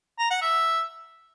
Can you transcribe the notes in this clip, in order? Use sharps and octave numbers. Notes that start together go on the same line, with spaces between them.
A#5
F#5
E5